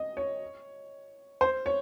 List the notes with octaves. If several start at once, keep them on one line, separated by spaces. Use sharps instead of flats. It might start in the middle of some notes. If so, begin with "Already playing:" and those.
Already playing: D#5
C#5
C5
C#5